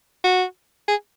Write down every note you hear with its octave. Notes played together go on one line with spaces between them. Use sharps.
F#4
G#4